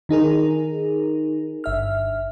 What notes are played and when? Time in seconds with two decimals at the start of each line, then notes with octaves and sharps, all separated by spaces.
0.09 D#3 D#4 G#4 A#4
1.64 G1 E5 F6